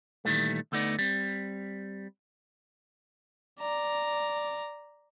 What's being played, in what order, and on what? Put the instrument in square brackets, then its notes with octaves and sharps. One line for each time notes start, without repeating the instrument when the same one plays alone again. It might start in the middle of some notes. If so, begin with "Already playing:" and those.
[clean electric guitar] A#2 D#3 E3 G3 A3
D2 A3 B3 D#4 D5
G3 C4
[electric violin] D5 A#5